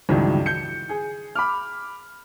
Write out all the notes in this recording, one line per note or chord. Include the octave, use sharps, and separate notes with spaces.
C#2 G2 D#3 E3 F#3
G6 C#7
G#4
B5 D6 F6